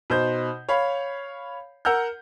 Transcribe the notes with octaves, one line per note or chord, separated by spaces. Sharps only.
B2 D#4 C5 G6
C#5 F5 B5
A#4 F#5 A#5 E6 F6 G6